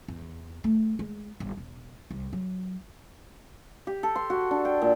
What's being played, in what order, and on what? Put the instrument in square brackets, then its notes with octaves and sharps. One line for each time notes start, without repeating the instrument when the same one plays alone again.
[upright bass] E2
A3
G#3
G1
E1
C2
F#3
[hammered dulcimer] G4
A4
C6
F#4
D4
G5
A#2